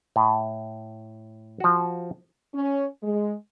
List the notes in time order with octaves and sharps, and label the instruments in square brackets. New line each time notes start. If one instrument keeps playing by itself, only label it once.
[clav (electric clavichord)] A2
F3 F#4
[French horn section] C#4
G#3